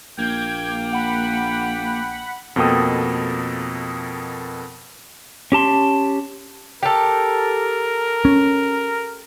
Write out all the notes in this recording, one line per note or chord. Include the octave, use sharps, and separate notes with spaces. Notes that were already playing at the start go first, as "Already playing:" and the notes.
A#1 A#3 G5 G6 G#6
F#5 B5
F2 B2 A#3 A4 G5 D#6
C#4 G4 A5 C6
G4 A4 A#4
C#4